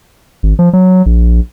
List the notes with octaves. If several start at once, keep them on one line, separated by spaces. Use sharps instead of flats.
G#1
F3
F#3
A#1